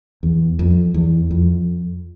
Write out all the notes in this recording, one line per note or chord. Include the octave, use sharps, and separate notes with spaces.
E2
F2
E2
F2